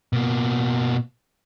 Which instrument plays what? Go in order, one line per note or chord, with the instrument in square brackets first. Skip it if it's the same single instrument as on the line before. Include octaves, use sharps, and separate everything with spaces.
[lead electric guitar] B2 A#3